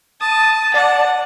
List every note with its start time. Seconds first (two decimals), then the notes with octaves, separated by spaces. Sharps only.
0.21 A5 D#6
0.74 D5 F#5 A5